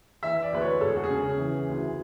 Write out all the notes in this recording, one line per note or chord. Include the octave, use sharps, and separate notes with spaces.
E3 E5
D5
D2 B4
C#5
E1 A4
G#4
F#4
G#4
C#3
E3
D2